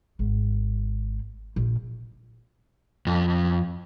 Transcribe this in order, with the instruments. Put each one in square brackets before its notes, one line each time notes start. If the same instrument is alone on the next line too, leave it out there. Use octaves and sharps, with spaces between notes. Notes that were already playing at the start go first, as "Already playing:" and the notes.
[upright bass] G#1
A#1
[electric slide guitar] F2